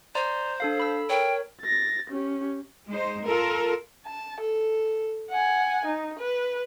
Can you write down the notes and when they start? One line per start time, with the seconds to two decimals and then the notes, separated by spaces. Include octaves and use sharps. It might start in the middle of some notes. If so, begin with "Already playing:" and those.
0.15 C5 D5 A#5 C6
0.60 D4 A4 F5
0.77 A4 B5 E6
1.10 A#4 C#5 G5
1.62 A6 A#6
2.10 C#4 G4
2.90 G#3 D#4 C5
3.26 F4 A4 A#4
4.06 A5
4.40 A4
5.30 F#5 G#5
5.85 D#4
6.18 B4